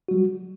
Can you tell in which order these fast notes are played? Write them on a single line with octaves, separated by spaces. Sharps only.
F#4 G3 F#3